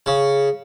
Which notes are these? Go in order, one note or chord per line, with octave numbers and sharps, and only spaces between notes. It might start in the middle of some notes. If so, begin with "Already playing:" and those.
C#3